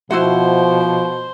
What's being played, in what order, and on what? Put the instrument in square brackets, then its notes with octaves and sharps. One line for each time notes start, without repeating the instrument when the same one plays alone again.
[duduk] B2 [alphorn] F3 [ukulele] E4 F#4 F#5 [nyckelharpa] C5